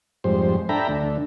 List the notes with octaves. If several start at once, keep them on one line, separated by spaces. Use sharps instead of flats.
F2 G#2 G3 C5
D4 A4 E5 G5 A#5 B5
D2 A3 D4